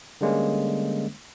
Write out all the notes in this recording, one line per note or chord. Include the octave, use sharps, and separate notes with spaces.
D3 G3 G#3 A#3 C#4